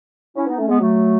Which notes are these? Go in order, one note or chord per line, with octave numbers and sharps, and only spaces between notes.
C#4 E4
B3 D#4
A3 C#4
G#3 B3
F#3 A3